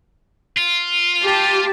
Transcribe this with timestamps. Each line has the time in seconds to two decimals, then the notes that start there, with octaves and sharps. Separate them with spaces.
0.58 F4
1.23 G4 A5